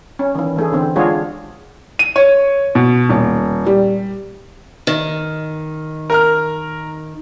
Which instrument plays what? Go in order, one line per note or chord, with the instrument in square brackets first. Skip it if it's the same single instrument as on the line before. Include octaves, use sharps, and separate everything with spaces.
[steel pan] C#4
D#3 E3
E3 A3 G#4
D3 E3 C4
G#3 D4 F4 F#4 G#4 C#5
[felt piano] D#7
C#5
B2
D#1
G3
[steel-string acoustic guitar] D#3
[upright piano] A#4 A#5 F6